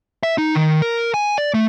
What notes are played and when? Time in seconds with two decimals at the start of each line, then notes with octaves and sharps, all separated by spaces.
0.23 E5
0.38 D#4
0.55 D#3
0.82 A#4
1.14 G#5
1.38 D5
1.54 A3